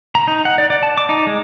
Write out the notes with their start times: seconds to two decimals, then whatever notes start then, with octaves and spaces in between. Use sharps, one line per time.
0.15 A#5
0.28 D#4
0.45 F#5
0.58 D5
0.70 D5
0.83 A5
0.98 D6
1.09 D#4
1.27 G#3